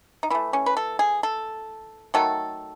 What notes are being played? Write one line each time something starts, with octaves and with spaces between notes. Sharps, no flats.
D#4
E3 A3 E4
C#4
B4
A4
G#4
A4
D#3 F#3 A3 A4